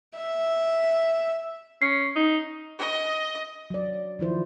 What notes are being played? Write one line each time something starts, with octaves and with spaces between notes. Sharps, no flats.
E5
C#4 C7
D#4
D#5
F#3 D5
D#3 F3 E4 C5